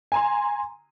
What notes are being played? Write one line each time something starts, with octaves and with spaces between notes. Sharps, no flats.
G#5 A#5 C6